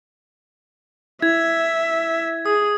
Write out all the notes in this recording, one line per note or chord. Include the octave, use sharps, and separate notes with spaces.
E4 E5 G#6
G#4 D#6